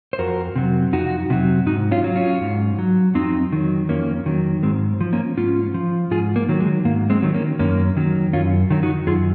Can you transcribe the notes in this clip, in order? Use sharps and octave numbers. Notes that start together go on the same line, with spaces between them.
C5
F2 F#4 A#4
C3 F#3
F2 D#4 F#4
C3 F#3
G#2 D#4 F#4
C#4 F4
F#3
C#4 F4
G#2
F#3
F2 C4 D#4
D#3 F#3
F2 A#3 C#4
D#3 F#3
G#2 G#3 C4
F3
A#3 C#4
G#2 C#4 F4
F3
G#2 F4 G#4
A#3
D#3 F#3
G#3
G#2 A#3
G#3 C4
D#3 F#3
A#3 C#4
F#2 A#3 C#4
D#3 F#3
F#2 C#4 F4
D#3 F#3
D#4 F#4
F#2 F4 G#4